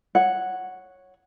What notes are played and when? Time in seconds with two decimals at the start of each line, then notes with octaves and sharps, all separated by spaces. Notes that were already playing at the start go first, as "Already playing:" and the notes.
0.15 C#5 F#5